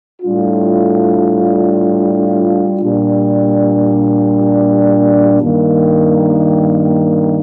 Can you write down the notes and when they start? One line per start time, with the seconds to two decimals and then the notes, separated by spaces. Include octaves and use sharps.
0.22 A2 G3 D4 F4
2.81 A#2 G3 D4
5.40 G2 D#3 A#3